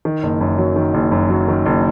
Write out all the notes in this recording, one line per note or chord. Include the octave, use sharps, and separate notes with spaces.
D#3
F#1
F#2
F#3
D#3
F#1
F#2
F#3
D#3
F#1